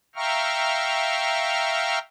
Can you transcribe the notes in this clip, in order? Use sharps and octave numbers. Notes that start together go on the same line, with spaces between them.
E5 F5 G5 A#5 C#6 F6